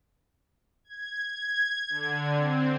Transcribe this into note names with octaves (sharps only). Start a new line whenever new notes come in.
G#6
G#6
D3
C4